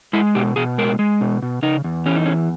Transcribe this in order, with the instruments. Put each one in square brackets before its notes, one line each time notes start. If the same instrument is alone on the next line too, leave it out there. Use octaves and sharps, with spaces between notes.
[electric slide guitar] G#3 E4
B2 G4
B2 G#4
G#3 A#4
G#3
B2
B2
C#3 D#4
E2
E3 C#4
D#4
E2 C#4